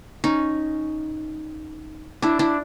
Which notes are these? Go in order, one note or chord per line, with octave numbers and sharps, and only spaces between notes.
C#4 D#4
D4 E4
D4 E4